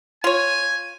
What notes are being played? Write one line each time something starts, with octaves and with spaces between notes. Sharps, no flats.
F4 C#5 G#5